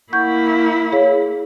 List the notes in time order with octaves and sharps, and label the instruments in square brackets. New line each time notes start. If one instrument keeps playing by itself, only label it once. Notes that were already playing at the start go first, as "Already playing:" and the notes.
[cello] A#3 E4 [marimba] F#5 C#6 G6
[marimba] G#4 C#5 F5